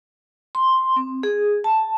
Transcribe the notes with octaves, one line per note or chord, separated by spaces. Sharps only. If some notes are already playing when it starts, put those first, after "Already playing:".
C6
C4
G#4
A5